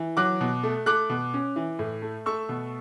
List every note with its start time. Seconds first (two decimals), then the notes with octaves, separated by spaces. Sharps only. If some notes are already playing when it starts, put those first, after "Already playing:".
Already playing: E3
0.17 F#3 D6 F#6
0.41 B2
0.63 A3
0.86 A3 D6 F#6
1.09 B2
1.34 C#4
1.56 E3
1.79 A2
2.02 A3
2.26 A3 C#6 E6
2.49 B2